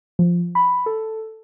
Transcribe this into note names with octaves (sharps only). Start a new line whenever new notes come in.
F3
B5
A4